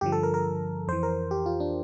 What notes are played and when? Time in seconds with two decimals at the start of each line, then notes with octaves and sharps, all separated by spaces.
0.01 G2 D3 F3 G4
0.12 A4
0.23 A#4
0.34 A#4
0.88 F2 E3 C5
1.03 A#4
1.31 G4
1.46 F4
1.60 D4